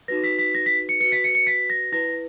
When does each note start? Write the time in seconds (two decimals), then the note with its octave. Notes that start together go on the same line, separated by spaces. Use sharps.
0.08 D#4 F#4 B4 A#6
0.24 B6
0.39 B6
0.55 A#6
0.66 B6
0.89 C#7
1.00 F#4 B4 C#7
1.12 B6
1.24 C#7
1.35 C#7
1.47 B6
1.70 A#6
1.92 E4 B4 A#6